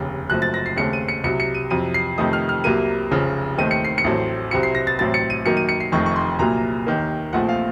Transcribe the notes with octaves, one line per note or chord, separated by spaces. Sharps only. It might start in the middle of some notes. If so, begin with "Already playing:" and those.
Already playing: F1 D#2 C#3
F#1 F#2 F3 A3 C4 F#6
A6
A#6
C7
D#2 C#3 A3 C4 C#7
D#7
C#7
C2 C3 F#3 C#7
C#7
D#7
F2 C3 F#3 D#7
C7
F2 C3 D#3 A3 D#6
F6
F6
C2 C3 F#3 A#3 D#7
F1 F2 C#3 F3
D#2 D#3 A3 C4 D#7
C#7
C7
C#7
A1 A2 F#3 A3 C4
C2 C3 F#3 C4 C#7
C7
A#6
A6
A1 A2 F#3 C4 A6
C#7
D#7
F#2 D#3 F#3 A#3 C#7
D#7
C#7
C7
F1 F2 D#3 A3 C#6
C#6
C6
C2 A#2 F#3 A#3 A#5
D#2 D#3 A#3
A#1 A#2 F3 A3 C4 F#5
F5